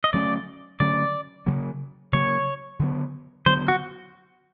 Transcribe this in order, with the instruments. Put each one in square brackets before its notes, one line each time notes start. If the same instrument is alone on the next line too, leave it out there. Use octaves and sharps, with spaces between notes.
[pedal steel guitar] D#5
[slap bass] D3 F#3 A3 C#4 [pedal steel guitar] D5
[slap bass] D3 F#3 A3 C#4 [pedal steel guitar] D5
[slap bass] C#3 F#3 A#3
[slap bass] C#3 F#3 A#3 [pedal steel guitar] C#5
[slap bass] D3 F#3 B3
[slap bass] D3 F#3 B3 [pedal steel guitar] C5
[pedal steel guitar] F#4